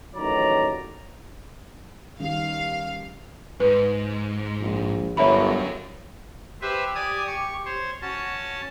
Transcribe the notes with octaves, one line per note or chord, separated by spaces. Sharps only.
A1 D#3 F#3 C#5 D5 A#5
D#3 G3 C#4 G4 F5
G#2 B4
A#1
G1 F#3 A#4 C#5 E5 B5
G4 B4 C5 E5
D5 G#5 D#6
C#6
C5 C#5
C#4 F#4 A5